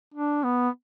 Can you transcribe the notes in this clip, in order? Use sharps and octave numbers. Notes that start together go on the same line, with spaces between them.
D4
B3